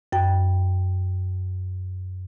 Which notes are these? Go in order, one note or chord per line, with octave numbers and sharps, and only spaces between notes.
F#2 G5